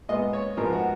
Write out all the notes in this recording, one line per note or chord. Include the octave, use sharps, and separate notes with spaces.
A#2 G#3 B3 D#5
C#5
G#2 F3 G#3 B3 A#4
F#4